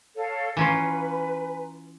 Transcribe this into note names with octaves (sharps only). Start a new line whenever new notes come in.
A4 C#5 F5
E3 C#4 F4 B4 G#5 A#5 C6